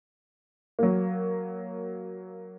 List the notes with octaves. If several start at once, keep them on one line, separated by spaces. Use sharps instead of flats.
F#3 A#3